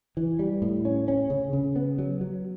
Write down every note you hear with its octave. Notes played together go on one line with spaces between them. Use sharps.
E3
G3
A2
C#4
C#4
C#3
C#3
B3
F#3
F#3